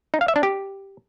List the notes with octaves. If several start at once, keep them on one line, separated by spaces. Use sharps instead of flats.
D#4
F5
E5
D4
G4